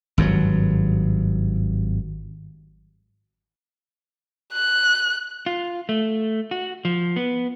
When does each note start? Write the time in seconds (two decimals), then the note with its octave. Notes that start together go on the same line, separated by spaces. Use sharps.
0.18 G#1 G2 C#3 F#3
4.53 F#6
5.46 F4
5.89 A3
6.51 F#4
6.85 F3
7.16 B3